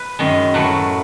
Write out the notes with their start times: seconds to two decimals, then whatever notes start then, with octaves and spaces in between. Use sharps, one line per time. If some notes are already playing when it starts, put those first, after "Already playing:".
Already playing: B4
0.19 F#2 D#3 G#3
0.54 A2 F#3 A3 B4